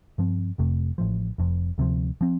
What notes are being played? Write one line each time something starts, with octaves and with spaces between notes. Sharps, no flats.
G2 F3 C4
F1 F2 C3 A3
A1 A2 F3
F1 F2 C3
D2 C3 F3
F3 C4